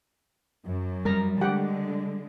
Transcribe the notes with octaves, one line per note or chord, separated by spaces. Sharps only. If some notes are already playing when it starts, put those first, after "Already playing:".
F#2
G3 A#4 A#5
D3 G#3 G4 F#5 G5